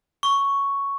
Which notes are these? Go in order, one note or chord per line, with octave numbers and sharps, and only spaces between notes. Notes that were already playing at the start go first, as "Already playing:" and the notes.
C#6